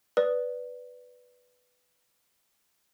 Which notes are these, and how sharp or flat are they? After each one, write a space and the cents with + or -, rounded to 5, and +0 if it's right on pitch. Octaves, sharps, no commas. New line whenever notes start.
B4 +0 D5 -5 D#6 +0